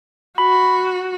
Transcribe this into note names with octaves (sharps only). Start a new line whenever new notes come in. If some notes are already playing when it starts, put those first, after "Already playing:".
F#4 B5